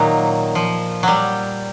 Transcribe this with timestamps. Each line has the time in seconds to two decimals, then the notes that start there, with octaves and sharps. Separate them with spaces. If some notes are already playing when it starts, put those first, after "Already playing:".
Already playing: A#2 D#3 F#3 A#3 D#4
0.55 F3
1.03 F#3 G3